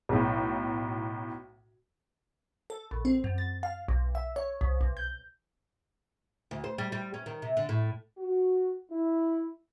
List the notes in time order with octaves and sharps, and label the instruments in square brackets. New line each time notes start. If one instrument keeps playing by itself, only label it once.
[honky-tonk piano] B1 A2
[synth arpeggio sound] A4
A#1
C4
F#2
A6
F5
B1
E5
C#5
C2
B1
G6
[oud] D2
C5
G3
G3
C#4
D#3
C3
D3
A2
[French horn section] F#4
E4